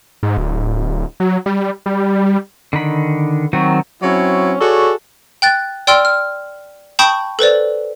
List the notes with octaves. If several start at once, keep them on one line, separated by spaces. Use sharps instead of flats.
G#2
D1
F#3
G3
G3
D3 D#3 B5
D#3 F#3 C4 F#4
F#3 C4 C#4 E4 C#5
F#4 G#4 A4 C#5 D5
G5 F#6 A6
D5 G5 C6 E6 F6 D7
F6
G5 A5 B5 C#6 D#6 G6
A4 B4 C5 D5